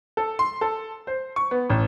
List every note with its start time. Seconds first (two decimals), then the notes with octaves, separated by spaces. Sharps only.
0.17 A4
0.39 C6
0.61 A4
1.07 C5
1.36 C#6
1.51 B3
1.70 A1